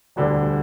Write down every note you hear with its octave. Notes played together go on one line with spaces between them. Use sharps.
E1 D2 D3 G3 D4